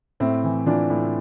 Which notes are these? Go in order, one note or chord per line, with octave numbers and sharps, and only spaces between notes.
A2 C4 E4
E3
E3 D4 F4
A2